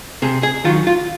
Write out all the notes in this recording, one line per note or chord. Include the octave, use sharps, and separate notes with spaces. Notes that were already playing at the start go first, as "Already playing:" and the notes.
C3 G#4
G#4
D#3 F#3 F4
F4